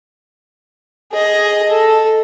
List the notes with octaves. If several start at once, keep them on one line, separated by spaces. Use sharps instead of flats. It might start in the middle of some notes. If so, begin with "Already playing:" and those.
G#4 D#5
A4